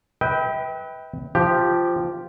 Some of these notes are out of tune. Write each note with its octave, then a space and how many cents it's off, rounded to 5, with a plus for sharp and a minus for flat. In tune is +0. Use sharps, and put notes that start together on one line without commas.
B4 +0 E5 -45 G5 +0
F3 -5 G4 +0